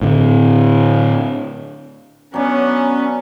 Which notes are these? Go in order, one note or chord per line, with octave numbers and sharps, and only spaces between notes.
A2 D3
F#3 B3 C#4 D4